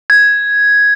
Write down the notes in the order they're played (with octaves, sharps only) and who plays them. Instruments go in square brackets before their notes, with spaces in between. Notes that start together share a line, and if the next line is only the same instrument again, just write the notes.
[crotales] G#6